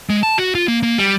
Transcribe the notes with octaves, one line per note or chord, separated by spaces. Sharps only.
G#3
A5
F#4
F4
A#3
A#3
G3